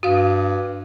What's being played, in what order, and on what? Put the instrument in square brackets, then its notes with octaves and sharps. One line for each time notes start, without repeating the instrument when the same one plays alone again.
[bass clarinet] G2 [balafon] F#4 F5